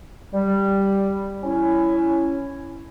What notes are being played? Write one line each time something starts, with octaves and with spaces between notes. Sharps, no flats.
G3
C#4 E4